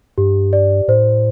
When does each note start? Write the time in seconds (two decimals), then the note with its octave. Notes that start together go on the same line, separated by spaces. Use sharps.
0.18 G2 G4
0.53 D5
0.88 A2 C5